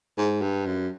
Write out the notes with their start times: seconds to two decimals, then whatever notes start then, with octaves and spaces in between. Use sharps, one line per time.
0.18 G#2
0.42 G2
0.66 F#2